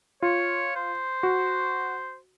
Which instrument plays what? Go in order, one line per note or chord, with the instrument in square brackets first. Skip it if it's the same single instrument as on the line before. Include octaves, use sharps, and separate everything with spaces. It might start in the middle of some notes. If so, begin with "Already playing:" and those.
[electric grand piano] F4 [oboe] C#5
[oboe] C5
[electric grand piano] F#4